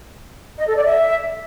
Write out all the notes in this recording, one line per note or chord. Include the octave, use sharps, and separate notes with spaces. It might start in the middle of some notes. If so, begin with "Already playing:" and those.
D#5
A4
D5
E5